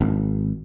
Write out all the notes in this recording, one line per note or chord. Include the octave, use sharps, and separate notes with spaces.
G#1